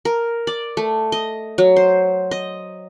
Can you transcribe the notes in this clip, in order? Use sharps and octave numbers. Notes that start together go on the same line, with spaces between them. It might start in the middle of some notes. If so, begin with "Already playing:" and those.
A#4
D5
A3
D#5
F#3
C5
D#5